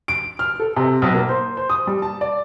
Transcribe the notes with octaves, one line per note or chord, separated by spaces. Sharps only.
D7
F6
A4
C3
B1
A#3
C5
C5
D#6
G3
A5
D5